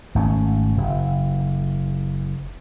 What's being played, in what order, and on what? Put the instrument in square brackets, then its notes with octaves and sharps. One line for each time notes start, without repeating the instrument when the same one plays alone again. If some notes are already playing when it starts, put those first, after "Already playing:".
[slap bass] G#1 A3 C4 C#4
F#1